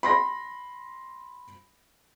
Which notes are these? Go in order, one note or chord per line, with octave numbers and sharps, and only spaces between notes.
B5 C6 A#6